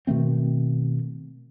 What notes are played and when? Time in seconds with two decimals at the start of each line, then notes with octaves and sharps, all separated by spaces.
0.07 B2 D#3 A3 C4